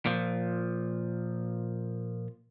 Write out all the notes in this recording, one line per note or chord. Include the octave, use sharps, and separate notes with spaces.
A#2 F3